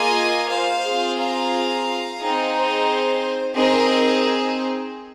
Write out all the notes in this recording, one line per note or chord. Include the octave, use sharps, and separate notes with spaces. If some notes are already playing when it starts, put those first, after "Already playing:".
Already playing: A#3 F4 G#4 D#5 G#5
C5 F5
C4 F4 G#4
F5 A#5
C4 D#4 G#4
C5
C4 D#4 G#4 A#4 D#5